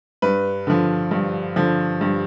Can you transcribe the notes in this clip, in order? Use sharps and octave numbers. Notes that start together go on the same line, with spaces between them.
G2 B4
D3 F3
G2
D3 F3
G2